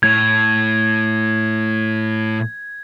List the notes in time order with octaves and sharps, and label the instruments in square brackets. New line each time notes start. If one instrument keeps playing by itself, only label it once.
[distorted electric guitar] A2 [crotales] G#6